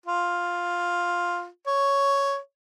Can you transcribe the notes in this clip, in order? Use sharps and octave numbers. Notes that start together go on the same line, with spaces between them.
F4
C#5